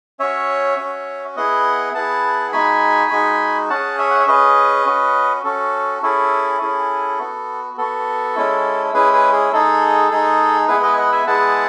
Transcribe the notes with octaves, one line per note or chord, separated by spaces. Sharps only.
C#4 F#4 C#5 E5
C#4 F#4
B3 E4 G#4 D#5 F#5
B3 E4 G#4 F#5 A5
G#3 D#4 F#4 G#5 B5
G#3 D#4 F#4
C#4 G#4 F#5 A5
C#5 E5
F#5
E5
C#4 G#4 B4 D#5
C#4 F#4
C#4 F#4 A4
C#4 E4 G#4 A4
C#4 E4 G#4
B3 F#4
B3 F#4 A4
G#3 C#4 E4
G#3 C#4 E4 G#4 B4
G#4 B4
G#4
G#3 D#4 G#4 A4
G#3 D#4 G#4
G#3 B3 E4 G#4 B4
B4 D#5
G#5
D#5 F#5
E5 G#5
G#3 B3 E4 G#4 F#5 A5